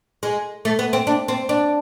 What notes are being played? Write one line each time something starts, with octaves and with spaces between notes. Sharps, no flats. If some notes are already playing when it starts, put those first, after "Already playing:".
G#3
A3
B3
C4
D4
C4
D4